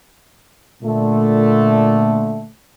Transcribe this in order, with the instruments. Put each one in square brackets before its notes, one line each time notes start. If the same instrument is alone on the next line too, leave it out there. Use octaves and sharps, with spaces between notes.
[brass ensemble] A#2 D3 A3